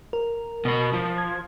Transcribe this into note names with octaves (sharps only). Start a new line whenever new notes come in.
A#4
B2 B5
F3
G#6